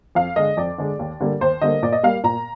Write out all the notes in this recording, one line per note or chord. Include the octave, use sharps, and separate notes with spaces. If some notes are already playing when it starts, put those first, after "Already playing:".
F2 F5
D3 G#3 D#5
F2 D5
D3 G#3
D#2
D3 G3 A#3
D#2 C5
D3 G3 A#3 D#5
A#2 D5
D#5
G3 A#3 F5
A#2 A#5